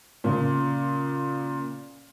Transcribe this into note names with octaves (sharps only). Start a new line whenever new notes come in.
A#2 C#3